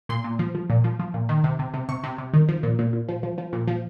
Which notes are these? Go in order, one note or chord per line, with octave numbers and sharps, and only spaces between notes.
A#2 C6
A#2
F3
F3
A#2
F3
F3
A#2
D#3
C3
C3
C3
C3 C#6
C3
C3
D#3
F3
A#2
A#2
A#2
F3
F3
F3
A#2
F3